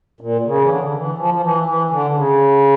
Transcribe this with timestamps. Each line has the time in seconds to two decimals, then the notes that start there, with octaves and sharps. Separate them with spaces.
0.21 A#2
0.46 C#3
0.61 E3
0.69 D3
0.84 D3
0.94 E3
1.18 F3
1.34 F3
1.43 E3
1.66 E3
1.90 D3
2.14 C#3